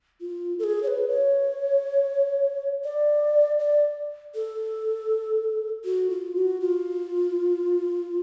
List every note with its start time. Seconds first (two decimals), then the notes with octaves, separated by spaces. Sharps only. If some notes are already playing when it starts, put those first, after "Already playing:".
0.21 F4
0.59 A4
0.64 G#4
0.83 C#5
0.88 B4
1.08 C#5
2.84 D5
3.59 D5
4.35 A4
5.84 F#4
6.10 F4
6.35 F#4
6.61 F4